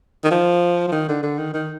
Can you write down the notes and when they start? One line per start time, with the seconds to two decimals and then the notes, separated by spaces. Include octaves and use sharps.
0.24 D#3
0.31 F3
0.88 F3
0.92 D#3
1.08 D3
1.23 D3
1.38 D#3
1.54 D#3